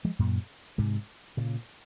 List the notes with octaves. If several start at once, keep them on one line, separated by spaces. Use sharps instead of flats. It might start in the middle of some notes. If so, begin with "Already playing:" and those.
F3 G#3
F#2 A#2
G#2 C3
A#2 C#3